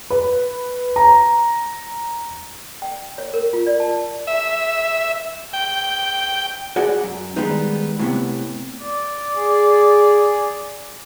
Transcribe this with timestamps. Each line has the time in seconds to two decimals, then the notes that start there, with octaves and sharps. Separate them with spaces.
0.10 B4
0.96 A#5
2.82 G5
3.18 C#5
3.34 A#4
3.53 F4
3.66 D5
3.80 A5
4.27 E5
5.53 G5
6.76 F#4 G#4 C#5 D5 F#5
7.03 F#2
7.36 D#3 G3 G#3 B3 D#4
7.99 A2 C3 B3
8.82 D5
9.35 G#4